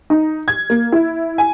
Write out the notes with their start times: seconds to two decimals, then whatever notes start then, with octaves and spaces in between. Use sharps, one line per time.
0.10 D#4
0.48 G#6
0.70 A#3
0.92 E4
1.38 G#5